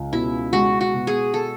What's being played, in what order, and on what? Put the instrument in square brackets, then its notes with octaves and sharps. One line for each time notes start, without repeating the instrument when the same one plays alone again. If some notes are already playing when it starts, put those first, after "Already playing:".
Already playing: [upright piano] C#2
[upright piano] B2 [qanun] E4
[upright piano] G#3 [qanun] F#4
[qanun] F#4
[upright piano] B2
[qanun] G#4
A4